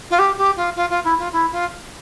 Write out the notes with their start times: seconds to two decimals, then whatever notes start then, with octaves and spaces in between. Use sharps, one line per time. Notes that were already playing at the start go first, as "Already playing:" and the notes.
0.10 F4
0.19 G4
0.37 G4
0.56 F4
0.76 F4
0.90 F4
1.04 E4
1.18 F4
1.32 E4
1.52 F4